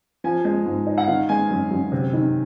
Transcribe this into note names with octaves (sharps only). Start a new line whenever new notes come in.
F3 G#5
G#3
G#2
D#4
F#5
D#3 F5
G#3 G#5
F#2
F#2
C3
D#3